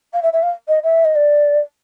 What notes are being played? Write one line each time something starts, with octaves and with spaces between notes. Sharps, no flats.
F5
E5
E5
F5
D#5
E5
D#5
D5